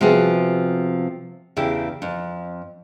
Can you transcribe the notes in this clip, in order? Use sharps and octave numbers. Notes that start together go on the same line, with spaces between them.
C3 F3 B3 F#4 G#4
E2 C#3 E4 G4
F2